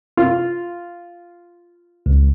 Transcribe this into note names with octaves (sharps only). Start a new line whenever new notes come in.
F4
C#2